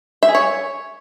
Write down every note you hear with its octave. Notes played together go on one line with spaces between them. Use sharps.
E5
G#4
C#5